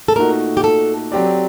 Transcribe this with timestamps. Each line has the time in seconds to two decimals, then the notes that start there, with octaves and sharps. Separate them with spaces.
0.08 A4
0.16 A#2 A3 D#4 F#4 A#4
0.57 G4
0.64 A4
1.12 F#3 C4 G4 D5